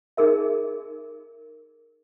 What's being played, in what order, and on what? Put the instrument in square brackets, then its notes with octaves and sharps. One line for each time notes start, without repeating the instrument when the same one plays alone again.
[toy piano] D#4 G#4 A#4 E5